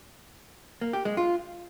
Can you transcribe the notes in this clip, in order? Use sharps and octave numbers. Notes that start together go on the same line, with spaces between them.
A#3
G4
G#3
F4